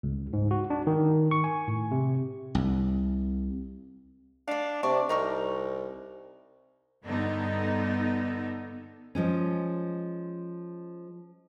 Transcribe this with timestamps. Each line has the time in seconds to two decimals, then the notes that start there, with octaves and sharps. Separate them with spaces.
0.03 C#2
0.33 G#2
0.51 F#4
0.70 D4
0.87 D#3
1.31 C#6
1.44 G#5
1.68 A2
1.91 C3
2.55 C2
4.48 D4 D5 F5
4.83 C3 D5 A5 C#6
5.09 C2 D#4 A#4 C#6
7.05 G2 D3 B3 D#4 A4
9.15 F3 G#3 C#4